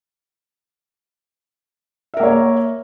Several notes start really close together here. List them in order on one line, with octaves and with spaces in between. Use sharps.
E5 A#4 A#3 C#5